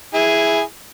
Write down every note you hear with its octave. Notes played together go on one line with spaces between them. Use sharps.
E4 G#4